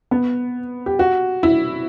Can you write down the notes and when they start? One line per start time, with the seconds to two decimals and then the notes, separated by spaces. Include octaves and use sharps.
0.11 B3
0.86 G4
0.99 F#4
1.43 E4